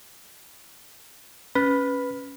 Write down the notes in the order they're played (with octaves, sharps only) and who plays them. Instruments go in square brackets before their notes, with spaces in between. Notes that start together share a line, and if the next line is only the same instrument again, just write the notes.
[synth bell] C#4 [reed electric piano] B4